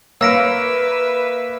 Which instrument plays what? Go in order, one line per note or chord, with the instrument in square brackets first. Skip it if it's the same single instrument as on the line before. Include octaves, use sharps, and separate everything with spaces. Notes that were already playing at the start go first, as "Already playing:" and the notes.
[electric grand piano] A#3 [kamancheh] B4 E5 [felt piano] C#5 F5 [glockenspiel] E6 A#6 D7